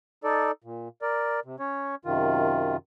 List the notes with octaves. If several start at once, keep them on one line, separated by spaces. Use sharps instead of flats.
D#4 A4 D5
A#2
A#4 D5
C3
C#4 C#5
F#2 C3 D#3 F4